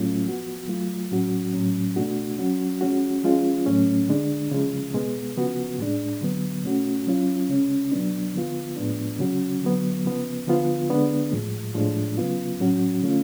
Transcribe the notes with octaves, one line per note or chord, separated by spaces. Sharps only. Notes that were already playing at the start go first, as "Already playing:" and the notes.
Already playing: A2 F#3 A3 C#4 F4
F3 B3 F#4
F#3 A3 F4
A2 F#3 C#4 F#4
A2 F#3 C#4
B2 A3 D4 F#4
F#3 C#4 F#4
F3 G#3 C#4 F#4
F3 G#3 C#4 F4
A2 F#3 A3 C#4
D3 G#3 D4
C#3 F3 G#3
B2 G#3 B3
C#3 F3 B3 F#4
A2 G#3 D4
D3 F#3 B3
B2 A3 C#4 F#4
F#3 C#4 F4
C#3 G#3 C#4
B2 F#3 B3 D4
D3 F3 B3 F4
A2 F3 G#3 B3 D4
C#3 F#3 C#4 F#4
D3 F#3 B3
C#3 F3 B3
D3 F3 B3 F4
D3 G#3 B3 D4
A2 F3 G#3
A2 F3 G#3 D4
C#3 F#3 B3 F4
A2 F#3 C#4 F#4
D3 F3 A3 C#4 F4